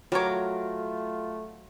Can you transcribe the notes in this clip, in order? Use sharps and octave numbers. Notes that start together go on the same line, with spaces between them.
F#3 G3 A3 F4 A#4 C#5 D6